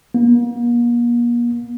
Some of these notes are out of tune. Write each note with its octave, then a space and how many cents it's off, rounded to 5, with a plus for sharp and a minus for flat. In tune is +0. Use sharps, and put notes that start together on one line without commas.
A#3 +40